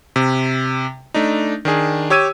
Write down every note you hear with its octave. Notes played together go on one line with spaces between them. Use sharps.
C3
A3 D4 D#4
D#3 D4 G#4
G4 C#5 E6 G#6 D#7